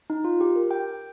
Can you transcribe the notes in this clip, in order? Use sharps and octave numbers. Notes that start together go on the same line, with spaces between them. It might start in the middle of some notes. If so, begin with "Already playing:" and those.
D#4
F4
G4
A#4
G5